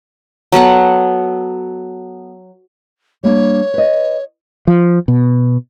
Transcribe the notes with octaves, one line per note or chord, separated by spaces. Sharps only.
F#3 B3 A4 F#5
G3 A#3 D4 C#5
B4 D#5
F3
B2